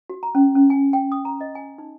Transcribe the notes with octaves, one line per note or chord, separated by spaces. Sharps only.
F#4
A#5
C#4
C#4
G#5
G5
D#6
A#5
D#5
G#5
D#4